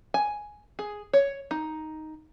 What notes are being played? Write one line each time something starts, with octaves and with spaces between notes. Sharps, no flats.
G#5
G#4
C#5
D#4